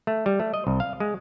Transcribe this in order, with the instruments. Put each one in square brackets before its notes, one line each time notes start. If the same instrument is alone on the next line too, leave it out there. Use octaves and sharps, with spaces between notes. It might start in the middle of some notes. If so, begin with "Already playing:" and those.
[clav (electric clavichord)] A3
G3
A3
D#5
C2
F5
G#3